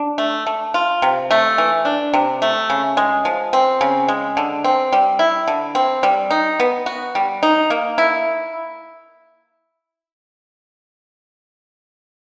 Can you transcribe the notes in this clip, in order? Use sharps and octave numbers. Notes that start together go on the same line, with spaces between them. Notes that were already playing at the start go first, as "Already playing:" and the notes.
Already playing: D4
A3
A3
F4
C3
A3
E3
D4
C3
A3
C#3
G#3
F3
C4
C#3
G#3
D3
C4
G3
E4
D3
C4
G3
D#4
B3
F#4
G3
D#4
A#3
E4